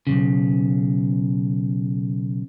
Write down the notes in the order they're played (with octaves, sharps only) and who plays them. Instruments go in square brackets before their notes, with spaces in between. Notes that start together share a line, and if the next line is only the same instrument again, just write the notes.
[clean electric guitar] B1 E2 C#3